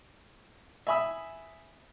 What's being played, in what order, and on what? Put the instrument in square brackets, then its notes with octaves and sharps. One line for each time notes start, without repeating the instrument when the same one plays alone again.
[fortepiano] E5 G#5 B5 D#6 E6